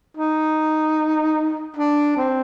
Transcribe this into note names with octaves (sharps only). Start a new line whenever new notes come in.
D#4
D4
C4